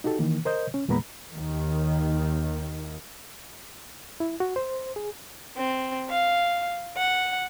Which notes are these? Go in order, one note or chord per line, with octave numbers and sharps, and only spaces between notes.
D#4 F#4 G4 A4
D#3 E3 A#3
A#4 C5 D#5 G6
C#4
E2 A#2 G#3 B3 A#5 B5
D#2 D#3
E4
F#4
C5
G#4
C4
F5
F#5